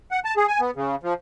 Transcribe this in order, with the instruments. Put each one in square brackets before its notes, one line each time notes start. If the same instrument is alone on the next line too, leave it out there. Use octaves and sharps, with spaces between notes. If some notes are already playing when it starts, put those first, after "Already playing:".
[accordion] F#5
A5
G#4
G#5
B3
C#3
F3